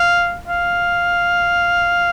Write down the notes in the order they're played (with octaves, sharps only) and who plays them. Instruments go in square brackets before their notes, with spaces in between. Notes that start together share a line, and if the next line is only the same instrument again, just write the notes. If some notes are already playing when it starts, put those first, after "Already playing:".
Already playing: [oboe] F5
F5